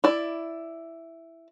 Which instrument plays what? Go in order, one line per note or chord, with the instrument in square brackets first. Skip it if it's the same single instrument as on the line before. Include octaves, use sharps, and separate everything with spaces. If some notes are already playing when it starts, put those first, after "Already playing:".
[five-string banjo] E4 D5